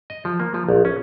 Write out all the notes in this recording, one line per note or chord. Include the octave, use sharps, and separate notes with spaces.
D#5
F3
A#3
F3
A#1
C#4